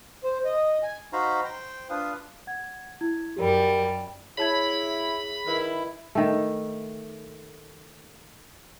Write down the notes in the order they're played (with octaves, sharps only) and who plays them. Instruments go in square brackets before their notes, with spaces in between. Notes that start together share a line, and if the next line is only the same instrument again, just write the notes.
[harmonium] C5
D#5
G#5
[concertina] D#4 F#4 C5 F5 A#5 B5
C5 G5
D4 F4 B4 F5 D#6
[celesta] F#5 G#6
E4 G#6
[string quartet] F#2 G3 [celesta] G4 A#4
[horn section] E4 [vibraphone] G#4 [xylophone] C#5 A5 G#6 [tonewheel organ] B5
[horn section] D#3 E4 [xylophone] A#4 B4
[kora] D#3 A3